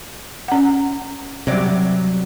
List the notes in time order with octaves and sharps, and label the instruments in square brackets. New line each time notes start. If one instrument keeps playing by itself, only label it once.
[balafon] C#4 F#5
[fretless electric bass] C3 G3 [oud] F#3 C#5 D5